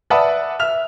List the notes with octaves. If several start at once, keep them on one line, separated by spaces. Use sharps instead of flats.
B4 D5 E5 F#5 A5 D#6
E5 F6 F7